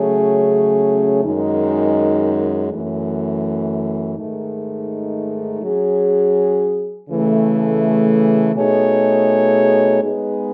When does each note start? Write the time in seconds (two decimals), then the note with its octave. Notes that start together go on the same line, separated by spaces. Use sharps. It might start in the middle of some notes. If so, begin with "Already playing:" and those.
Already playing: C#3 F#3 A3 C#4 G#4
1.22 F#2 D#3 G#3 D#4
2.70 F#2 E3 A3
4.16 G#2 D#3 A3 D#4
5.63 F#3 C#4 G#4
7.09 C#3 E3 A3
8.55 B2 A3 D#4 G#4 C#5
10.03 G#3 B3 D#4 G#4 B4